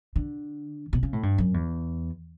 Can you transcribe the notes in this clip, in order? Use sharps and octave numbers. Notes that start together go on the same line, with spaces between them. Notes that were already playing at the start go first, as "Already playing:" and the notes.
D3
B2
C#3
A2
G2
F#2
E2